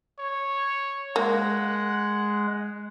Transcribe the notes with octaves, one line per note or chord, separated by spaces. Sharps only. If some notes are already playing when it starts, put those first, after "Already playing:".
C#5
G#3 A#3 F#5